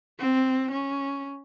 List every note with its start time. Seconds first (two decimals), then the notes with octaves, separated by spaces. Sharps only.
0.19 C4
0.71 C#4